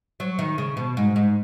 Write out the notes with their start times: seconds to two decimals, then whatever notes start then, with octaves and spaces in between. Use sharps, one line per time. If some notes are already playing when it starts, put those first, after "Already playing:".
0.20 F#3
0.39 D#3
0.58 C#3
0.77 B2
0.97 G#2
1.16 G#2